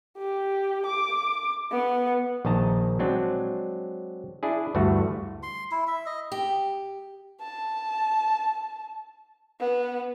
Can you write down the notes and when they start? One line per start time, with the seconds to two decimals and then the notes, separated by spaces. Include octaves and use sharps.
0.17 G4
0.85 D6
1.72 B3
2.45 A#1 D#3 D#5 A5 A#5
2.99 F#3 G#3 C4 D4
4.43 D4 E4 G#4
4.75 D2 G2 E3 A3 F#4
5.43 C6
5.72 E4
5.87 E5
6.06 D#5
6.32 G4
7.41 A5
9.60 B3